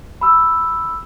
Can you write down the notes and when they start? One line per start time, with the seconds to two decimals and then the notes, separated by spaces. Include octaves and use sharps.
0.21 B5 E6